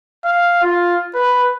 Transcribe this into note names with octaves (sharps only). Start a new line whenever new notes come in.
F5
F4
B4